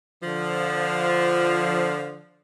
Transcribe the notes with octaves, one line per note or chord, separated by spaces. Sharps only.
D3 F3